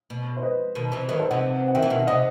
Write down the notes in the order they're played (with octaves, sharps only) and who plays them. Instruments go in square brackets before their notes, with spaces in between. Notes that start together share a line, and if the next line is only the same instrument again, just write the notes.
[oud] B2
[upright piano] C5
B4 D#5
[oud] B2 D#3
C3 E3
[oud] D#3 F#3 [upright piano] B4 D#5
[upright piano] A4 C5
[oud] C3 E3 [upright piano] D#5 F#5
[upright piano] F#5
[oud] D#3 [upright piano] E5 G5
[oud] E3
B2 D#3
[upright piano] E5
[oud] C3 [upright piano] D#5 F#5